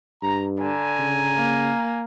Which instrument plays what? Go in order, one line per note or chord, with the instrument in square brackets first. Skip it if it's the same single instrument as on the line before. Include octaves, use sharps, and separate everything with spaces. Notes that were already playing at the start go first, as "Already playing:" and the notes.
[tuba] G2 [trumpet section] A#5
[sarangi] D3 [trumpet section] G#5 A#5
[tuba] C#3
[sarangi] A#3